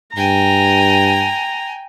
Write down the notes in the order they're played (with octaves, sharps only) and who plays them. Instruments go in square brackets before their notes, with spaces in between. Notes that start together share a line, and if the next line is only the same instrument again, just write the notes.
[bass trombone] G2 [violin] G5 G#5 [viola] A#5